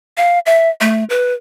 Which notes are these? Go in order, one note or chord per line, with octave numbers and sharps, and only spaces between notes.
F5
E5
A3
B4